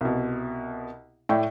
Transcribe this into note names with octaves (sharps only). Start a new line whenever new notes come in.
C2 B2
A2 A3 D5 G5